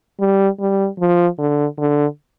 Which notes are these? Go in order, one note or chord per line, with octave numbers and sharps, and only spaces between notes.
G3
G3
F3
D3
D3